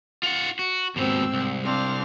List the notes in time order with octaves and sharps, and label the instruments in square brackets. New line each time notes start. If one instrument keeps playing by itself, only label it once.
[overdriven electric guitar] F4 F#5
F#4
[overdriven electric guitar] D#2 B2 [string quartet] G#2 C4 E6
[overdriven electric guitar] C2
[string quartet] C4 D4 F5